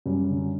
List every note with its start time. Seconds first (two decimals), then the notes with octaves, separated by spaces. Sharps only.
0.06 F#2 G3
0.30 D3